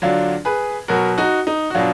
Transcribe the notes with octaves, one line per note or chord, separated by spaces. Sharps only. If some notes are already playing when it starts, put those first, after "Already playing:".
D3 F#3 D4 F4
G#4 B4
B2 F#3 F#4 A#4
D#4 F#4
D#4
F#4
B2 F#3 D4 F4